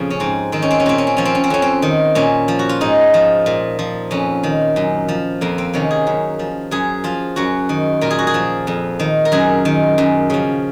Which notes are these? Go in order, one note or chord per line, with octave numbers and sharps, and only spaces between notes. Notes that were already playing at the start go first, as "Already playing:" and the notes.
Already playing: F2 A#2 C#3 F3
C#4
G#2 C4
D#3 C4
C#4
C4
C#4
A#2 C4
C#4
C4
F3 C#4
C4
C#4
C4
F2 C#4
C4
D#3
A#2 C#4
F3
F#4
F4
G#2 D#4
F3
A#2
F3
F2 C#4
D#3
F#2
F3
F2 A#3
C4
C3 D#3 C#4
G#4
F#2
F3
F#2 G#4
F3 F4
F#2 F#4
D#3
A#2 A#4
G#4
F#4
G#4
F3
F2
D#3
A#4
F#2 G#4
D#3
F#2
C#3 F3